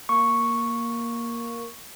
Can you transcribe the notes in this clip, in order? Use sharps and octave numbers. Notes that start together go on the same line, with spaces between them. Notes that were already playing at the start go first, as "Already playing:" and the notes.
A#3 C#6